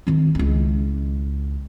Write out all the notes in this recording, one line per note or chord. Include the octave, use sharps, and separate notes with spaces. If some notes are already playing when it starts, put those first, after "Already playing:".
D#3 C4
C#2 E4